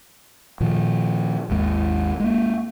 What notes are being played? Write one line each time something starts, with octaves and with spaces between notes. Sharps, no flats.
A#2 D#3 F3
G#1 D#2 G#3
G#3 A#3